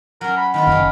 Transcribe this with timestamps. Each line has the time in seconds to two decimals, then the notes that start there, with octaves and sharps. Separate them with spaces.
0.21 F#3 C#4 A#4
0.37 B5
0.54 D#3 B3 F4 B5
0.67 F#1 C#4 D#4 A#4